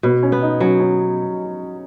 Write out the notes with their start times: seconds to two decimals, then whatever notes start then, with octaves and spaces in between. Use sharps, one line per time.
0.03 B2 B3
0.23 C#4
0.32 B3
0.42 D#4
0.60 F#3 C#4
0.80 C#4